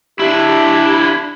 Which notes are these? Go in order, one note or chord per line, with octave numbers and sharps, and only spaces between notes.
D4 E4 G4